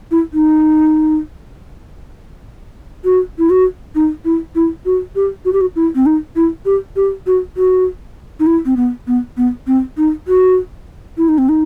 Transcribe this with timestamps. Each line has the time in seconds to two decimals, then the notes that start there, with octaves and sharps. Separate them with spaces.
0.11 E4
0.34 D#4
3.05 F#4
3.39 E4
3.50 F#4
3.95 D#4
4.25 E4
4.55 E4
4.86 F#4
5.16 G4
5.45 F#4
5.53 G4
5.61 F#4
5.76 E4
5.95 C4
6.06 D#4
6.36 E4
6.66 G4
6.96 G4
7.27 F#4
7.57 F#4
8.40 D#4
8.47 E4
8.66 C4
8.77 B3
9.07 B3
9.37 B3
9.67 C4
9.97 D#4
10.28 F#4
11.18 E4
11.29 D#4
11.38 C4
11.49 D#4